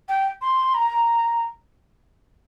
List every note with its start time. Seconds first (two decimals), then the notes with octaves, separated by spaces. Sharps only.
0.09 G5
0.42 C6
0.74 A#5